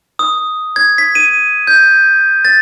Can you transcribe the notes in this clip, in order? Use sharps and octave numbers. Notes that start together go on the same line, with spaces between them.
D#6
G#6
B6
D#7
G6
A6